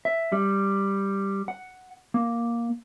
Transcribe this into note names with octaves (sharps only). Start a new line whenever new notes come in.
E5
G3
F#5
A#3